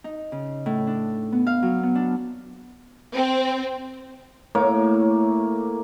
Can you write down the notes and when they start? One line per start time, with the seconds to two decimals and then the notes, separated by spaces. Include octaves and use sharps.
0.04 D#4
0.32 C#3
0.66 A2
0.87 D4
1.32 B3
1.47 F5
1.63 F#3
1.83 B3
1.95 D4
3.14 C4
4.55 A2 A#3 C#5 D6